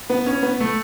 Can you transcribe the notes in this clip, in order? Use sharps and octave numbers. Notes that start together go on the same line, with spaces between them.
B3
C#4
B3
A3